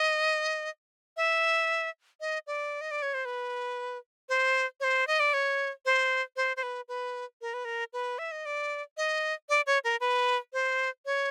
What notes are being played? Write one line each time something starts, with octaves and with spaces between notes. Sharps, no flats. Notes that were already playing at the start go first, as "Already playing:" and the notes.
Already playing: D#5
E5
D#5
D5
D#5
D5
C#5
C5
B4
C5
C#5
C5
D#5
D5
C#5
C5
C5
C5
B4
B4
A#4
B4
A#4
B4
E5
D#5
D5
D#5
D5
C#5
A#4
B4
C5
C#5